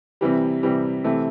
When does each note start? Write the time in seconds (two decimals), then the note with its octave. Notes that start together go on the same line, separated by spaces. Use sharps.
0.21 C3 E3 G3
0.63 C3 E3 G3
1.04 C3 E3 A3